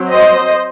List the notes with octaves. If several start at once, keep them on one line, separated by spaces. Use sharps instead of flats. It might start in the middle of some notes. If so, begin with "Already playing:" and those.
Already playing: F#3 C4
C5 D#5